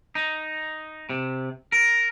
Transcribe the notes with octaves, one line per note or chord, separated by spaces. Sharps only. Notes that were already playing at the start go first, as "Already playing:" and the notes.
D#4
C3
A#4